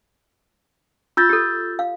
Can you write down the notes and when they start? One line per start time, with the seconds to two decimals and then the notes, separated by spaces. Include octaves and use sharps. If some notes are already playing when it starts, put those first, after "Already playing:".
1.17 F4 E6 G6 A6
1.29 G4 A4
1.79 F5